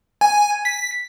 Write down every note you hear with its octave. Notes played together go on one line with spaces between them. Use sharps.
G#5
B6